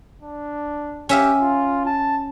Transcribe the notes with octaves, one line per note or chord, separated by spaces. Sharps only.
D4
C#4 G4 E5 F5
F4
A5